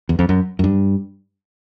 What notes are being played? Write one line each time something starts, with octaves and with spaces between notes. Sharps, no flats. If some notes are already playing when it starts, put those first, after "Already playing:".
E2
F2
F#2
F#2
G2